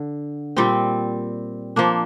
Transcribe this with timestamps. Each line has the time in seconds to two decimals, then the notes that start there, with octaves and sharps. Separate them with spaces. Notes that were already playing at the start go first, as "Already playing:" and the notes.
Already playing: D3
0.56 A#2 G3 C4
1.76 F3 A#3 D4